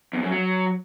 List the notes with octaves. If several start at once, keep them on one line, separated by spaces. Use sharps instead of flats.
E2
F#2
F#3